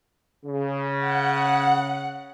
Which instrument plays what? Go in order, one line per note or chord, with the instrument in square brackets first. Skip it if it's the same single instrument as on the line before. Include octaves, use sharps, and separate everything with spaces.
[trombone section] C#3
[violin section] F#5